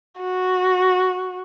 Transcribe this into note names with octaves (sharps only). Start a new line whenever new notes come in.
F#4